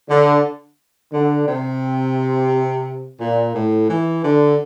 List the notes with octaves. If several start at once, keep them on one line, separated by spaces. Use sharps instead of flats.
D3
D3
C3
A#2
A2
E3
D3